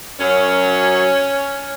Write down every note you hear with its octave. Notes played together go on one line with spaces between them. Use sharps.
F#2 F#3 C#4